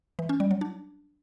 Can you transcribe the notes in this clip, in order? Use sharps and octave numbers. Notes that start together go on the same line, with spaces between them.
E3
C#4
G3
F#3
D4